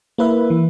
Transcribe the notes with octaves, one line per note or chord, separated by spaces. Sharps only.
A#3 E4 B4 E5
E3